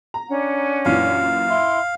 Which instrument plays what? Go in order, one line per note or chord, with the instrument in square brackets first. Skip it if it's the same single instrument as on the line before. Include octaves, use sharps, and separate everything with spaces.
[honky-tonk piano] A#5
[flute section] C#4 D4 F#5
[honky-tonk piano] F#2 A#2 E3 [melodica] F5
[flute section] E4 C6